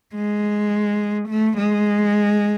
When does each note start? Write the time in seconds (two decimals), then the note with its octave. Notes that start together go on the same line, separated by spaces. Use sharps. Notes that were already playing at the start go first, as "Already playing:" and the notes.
0.15 G#3
1.29 A3
1.58 G#3